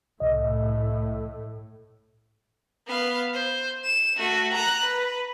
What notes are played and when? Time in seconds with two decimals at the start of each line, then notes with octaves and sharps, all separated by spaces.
0.20 C2 A2 D#5
2.87 B3 F5
3.33 C5
3.84 E7
4.17 A3 F#4
4.54 A#5 F#6
4.85 B4